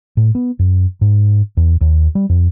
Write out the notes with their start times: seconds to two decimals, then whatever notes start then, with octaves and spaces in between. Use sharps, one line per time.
0.17 A2
0.35 B3
0.59 F#2
1.01 G#2
1.57 E2
1.81 D#2
2.15 G3
2.29 F2